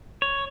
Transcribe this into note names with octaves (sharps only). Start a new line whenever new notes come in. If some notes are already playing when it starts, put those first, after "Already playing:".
C#5